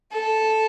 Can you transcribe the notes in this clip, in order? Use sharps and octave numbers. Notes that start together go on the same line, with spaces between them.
A4